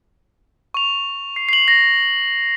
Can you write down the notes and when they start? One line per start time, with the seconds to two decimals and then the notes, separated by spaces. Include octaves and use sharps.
0.74 C#6 F7
1.36 C7
1.49 C7 F#7
1.68 A#6